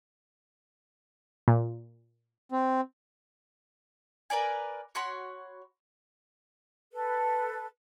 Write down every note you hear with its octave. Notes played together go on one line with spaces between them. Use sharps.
A#2
C4
A#4 B4 D5 G#5
F#4 C#5 B5 C6
A4 B4